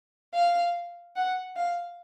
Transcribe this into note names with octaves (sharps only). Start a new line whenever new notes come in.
F5
F#5
F5